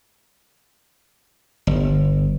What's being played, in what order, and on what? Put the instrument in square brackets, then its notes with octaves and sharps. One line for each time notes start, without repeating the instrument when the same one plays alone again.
[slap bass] G1